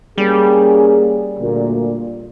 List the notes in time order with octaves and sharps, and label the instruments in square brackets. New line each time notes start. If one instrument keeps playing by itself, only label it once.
[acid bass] G3 [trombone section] A#3 C#4 G#4
[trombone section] D2 A#2